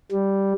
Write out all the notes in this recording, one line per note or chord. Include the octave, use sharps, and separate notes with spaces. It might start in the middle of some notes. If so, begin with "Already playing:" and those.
G3